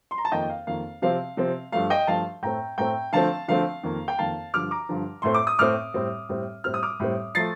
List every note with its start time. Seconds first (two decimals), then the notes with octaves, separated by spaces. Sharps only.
0.11 C6
0.18 A#5
0.25 A5
0.32 F2 D#3 A#3 D#5 G5
0.50 F5
0.67 F2 D#3 A#3 F5
1.02 C3 F3 C4 F5
1.37 C3 F3 C4
1.72 G2 F3 A3 F5
1.90 D#5 G5
2.07 G2 F3 A3 F5 A5
2.42 A2 A3 C4 G5 A#5
2.78 A2 A3 C4 G5 A#5
3.13 D3 F3 A3 C4 F5 A5
3.48 D3 F3 A3 C4 F5
3.83 F2 D#3 A#3
4.08 G5
4.19 F2 D#3 A#3 F5 A5
4.54 G2 D3 F3 D6 F6
4.71 A#5 D6
4.89 G2 D3 F3
5.22 A2 A3 C4 C6
5.35 D6
5.47 D#6
5.59 A2 A3 C4 D6 F6
5.94 A2 G3 C4
6.29 A2 G3 C4
6.64 A2 G3 C4 F6
6.74 D#6
6.83 D6 F6
7.00 A2 G3 C4
7.35 F3 A3 A6 C7